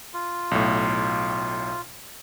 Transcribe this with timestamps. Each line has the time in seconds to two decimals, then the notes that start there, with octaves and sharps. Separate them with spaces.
0.14 F4
0.51 B1 A2